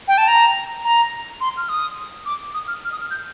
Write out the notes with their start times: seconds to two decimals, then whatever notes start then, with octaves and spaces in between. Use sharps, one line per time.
0.08 G5
0.18 A5
0.28 A#5
0.84 A#5
1.41 C6
1.57 F6
1.69 D#6
2.26 D6
2.54 D#6
2.68 F6
2.85 F6
2.92 D#6
3.01 F6
3.11 G6